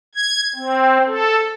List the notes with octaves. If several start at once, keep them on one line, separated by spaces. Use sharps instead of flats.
G#6
C4
A4